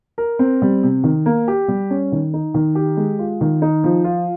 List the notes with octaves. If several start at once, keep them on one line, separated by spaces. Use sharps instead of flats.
A#4
C4
G3
C3
D#3
A#3
G4
G3
C#4
D#3
D#4
D#3
G4
G#3
F4
D#3
D#4
F3
F4